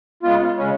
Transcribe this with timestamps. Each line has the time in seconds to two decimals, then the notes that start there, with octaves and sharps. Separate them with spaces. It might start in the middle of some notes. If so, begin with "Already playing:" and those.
0.23 C#3 G#3 B3 F4
0.57 C#3 G#3 C#4